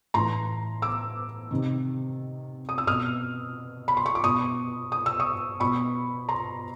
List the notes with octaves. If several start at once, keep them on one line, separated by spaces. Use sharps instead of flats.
A2 E3 A#5 C6
D6 E6
C3 D#3
D#6
E6
B2 D#6 F6
B5
C6
C#6
D6
B2 C#6 D#6
D#6
E6
C#6 D#6
B2 B5 C#6
A#5 C6